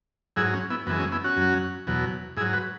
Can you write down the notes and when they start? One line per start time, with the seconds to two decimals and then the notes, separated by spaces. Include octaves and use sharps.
0.36 G#2 F#3 E4 G#4
0.53 C#4
0.70 B3 E4
0.86 F#2 B3
0.89 E3 G#3
0.99 C#4
1.12 B3 E4
1.24 C#4 F#4
1.37 F#2 F#3
1.87 E2 B2 F#3
2.37 G#2 E4 G#4
2.41 F#3
2.53 F#4 B4